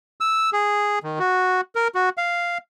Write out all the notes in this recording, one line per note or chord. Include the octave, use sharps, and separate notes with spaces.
E6
G#4
D#3
F#4
A#4
F#4
F5